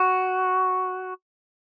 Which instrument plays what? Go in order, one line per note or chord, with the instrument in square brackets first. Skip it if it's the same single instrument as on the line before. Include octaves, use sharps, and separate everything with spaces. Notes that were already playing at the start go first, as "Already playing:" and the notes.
Already playing: [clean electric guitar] F#4